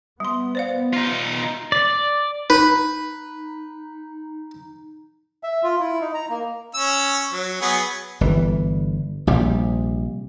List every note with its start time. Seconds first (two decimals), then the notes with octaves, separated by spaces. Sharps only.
0.20 G3 B3 C6
0.55 C5 D5 F5
0.94 D#4 F4
1.72 D5
2.50 D#4 B4
5.43 E5
5.63 F4
5.80 E4
6.01 D#4
6.14 A#5
6.30 A#3
6.75 C#4 E6
7.33 F#3
7.61 F#3 B3 G#4
8.21 G1 E3
9.27 A#1 C3 G3